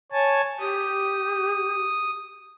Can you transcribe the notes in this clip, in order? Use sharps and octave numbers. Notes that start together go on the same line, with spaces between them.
C#5 G#5 A5
G4 D#6